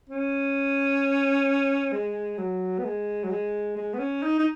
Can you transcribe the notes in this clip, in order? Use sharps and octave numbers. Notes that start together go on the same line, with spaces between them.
C#4
G#3
F#3
B3
G#3
F#3
G#3
G#3
B3
C#4
D#4
D#4